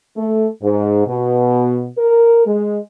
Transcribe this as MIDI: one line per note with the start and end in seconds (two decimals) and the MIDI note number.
0.17 0.47 57
0.62 1.02 44
1.06 1.87 47
1.97 2.45 70
2.46 2.78 56